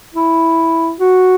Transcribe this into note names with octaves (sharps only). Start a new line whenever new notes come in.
E4
F#4